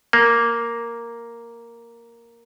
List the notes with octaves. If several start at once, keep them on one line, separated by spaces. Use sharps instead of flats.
A#3